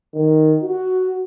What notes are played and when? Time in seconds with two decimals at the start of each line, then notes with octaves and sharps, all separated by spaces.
0.14 D#3
0.63 F#4